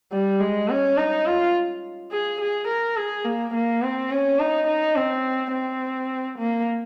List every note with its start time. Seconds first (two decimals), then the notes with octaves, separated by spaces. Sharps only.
0.12 G3
0.40 G#3
0.69 C#4
0.97 D#4
1.26 F4
2.12 G#4
2.40 G#4
2.68 A#4
2.96 G#4
3.24 A#3
3.54 A#3
3.83 C4
4.11 C#4
4.39 D#4
4.67 D#4
4.96 C4
5.52 C4
6.38 A#3